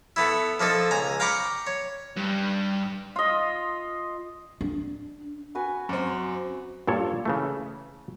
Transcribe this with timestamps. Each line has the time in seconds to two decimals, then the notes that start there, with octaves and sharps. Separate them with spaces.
0.16 A3 B3 E4
0.60 F3 A#3 D#4 A4
0.91 C#2 G#5 A#5
1.20 F5 G5 A#5 B5 C#6 D6
1.67 C#5
2.16 G2
3.16 F4 D#5
4.61 D4
5.55 F#4 B4 G#5
5.89 F#2 C4 D6
6.87 G2 A#2 A4 C#5
7.25 C#3 E3 A3